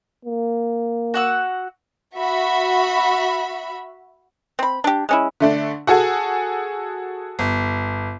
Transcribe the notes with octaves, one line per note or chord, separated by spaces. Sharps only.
A#3
F#4 F#5 E6
F#4 E5 B5
C4 B5
D4 G4
G#3 C#4 E4
D3 A3 D4
F#4 G#4 A4 F#5 G#5
G1